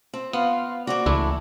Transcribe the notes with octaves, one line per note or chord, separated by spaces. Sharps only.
C4
B3 F4 F5
A#3 C4 F#4 D5
C#2 E3 A3 D4 E4